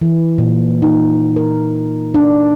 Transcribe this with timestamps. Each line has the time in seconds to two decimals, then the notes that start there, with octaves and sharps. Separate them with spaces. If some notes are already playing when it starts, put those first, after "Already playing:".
0.01 E3
0.38 A#2
0.82 D#4
1.36 A#4
2.14 D4